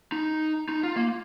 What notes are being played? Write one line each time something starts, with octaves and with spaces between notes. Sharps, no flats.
D#4
D#4
F4
A#3